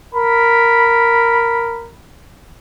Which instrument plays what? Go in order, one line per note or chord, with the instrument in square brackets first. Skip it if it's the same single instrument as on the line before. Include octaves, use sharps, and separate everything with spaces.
[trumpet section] A#4 B5